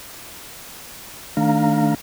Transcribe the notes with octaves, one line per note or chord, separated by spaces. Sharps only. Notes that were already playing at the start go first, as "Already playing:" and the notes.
D#3 A3 D4 F5 A#5